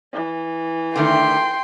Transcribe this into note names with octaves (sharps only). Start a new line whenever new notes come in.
E3
D3 D#3 A3 G5 C6